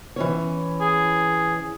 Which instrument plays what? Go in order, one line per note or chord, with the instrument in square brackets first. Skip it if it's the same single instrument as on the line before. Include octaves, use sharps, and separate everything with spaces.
[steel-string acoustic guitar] E3 C#4 C#5
[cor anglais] G#4